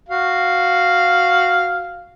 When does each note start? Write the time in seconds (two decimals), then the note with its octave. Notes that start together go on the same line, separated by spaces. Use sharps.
0.09 F#4 F5